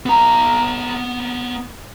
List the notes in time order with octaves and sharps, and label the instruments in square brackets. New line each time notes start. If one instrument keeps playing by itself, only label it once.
[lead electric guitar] B3 A#5